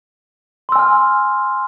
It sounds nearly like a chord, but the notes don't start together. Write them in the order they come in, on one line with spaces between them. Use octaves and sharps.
C6 E6 G#5 F6